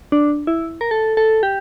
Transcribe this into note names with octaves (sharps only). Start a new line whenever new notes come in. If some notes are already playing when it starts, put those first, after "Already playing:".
D4
E4
A#4
A4
A4
G4